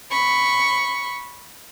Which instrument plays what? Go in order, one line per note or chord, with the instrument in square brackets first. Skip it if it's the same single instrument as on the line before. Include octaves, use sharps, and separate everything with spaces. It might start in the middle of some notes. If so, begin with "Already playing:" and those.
[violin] B5 C#6